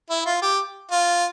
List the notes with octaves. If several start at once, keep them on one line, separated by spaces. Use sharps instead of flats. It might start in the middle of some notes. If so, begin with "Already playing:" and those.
E4
F4
G4
F4